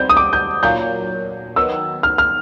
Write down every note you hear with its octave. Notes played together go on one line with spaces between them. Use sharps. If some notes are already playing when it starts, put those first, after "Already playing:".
Already playing: G3 C4 D#4 G6
D#6
D6
G6
A#2 F#3 A#3 G6
D#3 F#3 B3 E6
F6
F6